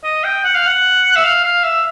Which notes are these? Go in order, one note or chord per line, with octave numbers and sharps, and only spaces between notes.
D#5
G5
F#5
F5
F#5
E5
F5
F5
E5